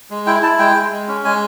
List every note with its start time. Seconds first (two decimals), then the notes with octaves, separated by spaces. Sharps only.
0.11 G#3
0.27 E4 G5
0.43 E4 A5
0.59 G#3 G5
0.76 G#3
0.91 G#3
1.08 C#4
1.25 G#3 G#5